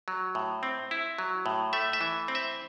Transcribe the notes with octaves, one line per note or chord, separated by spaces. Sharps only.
F#3
A2
C4
E4
F#3
A2
A3 E5
E5
E3
C4
E5